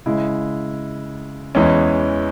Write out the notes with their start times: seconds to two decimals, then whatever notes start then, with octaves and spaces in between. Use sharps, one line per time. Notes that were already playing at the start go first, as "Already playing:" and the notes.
0.06 C#3 G#3 E4
1.55 E2 E3 G#3 C#4